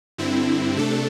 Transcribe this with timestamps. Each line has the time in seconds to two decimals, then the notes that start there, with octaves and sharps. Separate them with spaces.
0.18 G2 D3 C4 E4
0.76 C3 A3 D4 A4